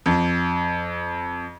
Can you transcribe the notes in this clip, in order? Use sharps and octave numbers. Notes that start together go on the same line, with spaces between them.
F2